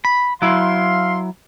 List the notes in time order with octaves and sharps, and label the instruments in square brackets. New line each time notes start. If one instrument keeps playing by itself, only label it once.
[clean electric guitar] B5
[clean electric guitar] F#3 E4 [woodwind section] F5 C6